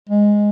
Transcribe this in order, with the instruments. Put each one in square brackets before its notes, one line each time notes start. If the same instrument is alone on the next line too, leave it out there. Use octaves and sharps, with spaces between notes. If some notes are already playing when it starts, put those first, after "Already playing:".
[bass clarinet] G#3